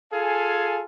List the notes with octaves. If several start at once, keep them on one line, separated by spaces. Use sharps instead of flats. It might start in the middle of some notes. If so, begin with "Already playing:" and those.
F4 G#4 A4 F5 G#5